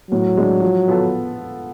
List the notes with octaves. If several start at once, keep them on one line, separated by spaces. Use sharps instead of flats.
A2 F#3
G#3 D4
F3
B3 F4 A4